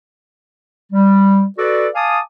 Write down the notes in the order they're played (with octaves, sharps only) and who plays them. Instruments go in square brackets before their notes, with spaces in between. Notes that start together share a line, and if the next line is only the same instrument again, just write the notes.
[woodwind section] G3
F#4 A4 B4 D5
F5 G#5 A5 D6 D#6